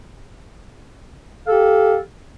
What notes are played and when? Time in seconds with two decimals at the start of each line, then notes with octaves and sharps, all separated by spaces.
1.46 F5
1.49 A4
1.51 G4